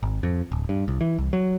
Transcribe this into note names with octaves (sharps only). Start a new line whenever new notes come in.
G#1
F2
D1
G2
C2
E3
C2
F#3